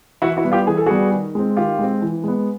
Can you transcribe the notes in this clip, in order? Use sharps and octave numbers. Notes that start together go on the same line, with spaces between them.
E3 E4 F#4
E4 F#4
G3 B3
F4 G4
E3 G#4
A4
G3 B3 F#4 G#4
D#3
G#3 C4
D#3 F4 G4
G#3 C4
E3
G#3 B3